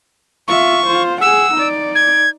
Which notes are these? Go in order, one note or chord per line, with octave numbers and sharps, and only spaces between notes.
F4 E5 C#6
F4 C5
G#4 F#5 E6
D#4 D5
G#6